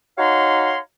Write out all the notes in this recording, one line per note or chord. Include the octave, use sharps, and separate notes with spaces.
D#4 F#4 C#5 F5 A#5 C6